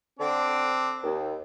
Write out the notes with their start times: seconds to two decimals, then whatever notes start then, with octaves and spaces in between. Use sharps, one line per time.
0.19 D3 C4 D4
1.04 D#2